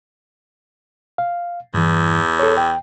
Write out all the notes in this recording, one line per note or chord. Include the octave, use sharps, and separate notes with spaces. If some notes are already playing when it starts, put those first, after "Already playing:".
F5
E2 G2 E3
A4 C#5
G5